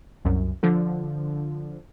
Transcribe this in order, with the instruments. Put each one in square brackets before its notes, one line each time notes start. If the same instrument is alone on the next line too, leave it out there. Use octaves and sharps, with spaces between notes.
[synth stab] C2 F#2
D3 F3